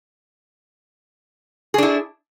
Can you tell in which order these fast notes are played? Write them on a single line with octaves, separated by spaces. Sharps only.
G#4 D4 E4